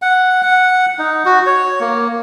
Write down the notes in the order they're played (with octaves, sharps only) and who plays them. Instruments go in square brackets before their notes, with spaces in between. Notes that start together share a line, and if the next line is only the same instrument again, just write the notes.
[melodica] F#5
F#5
D#4
F#4
C#5
A#3